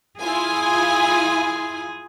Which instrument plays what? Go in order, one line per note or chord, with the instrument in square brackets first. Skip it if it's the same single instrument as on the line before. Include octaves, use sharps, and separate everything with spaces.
[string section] E4 F4 G#5 [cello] G#4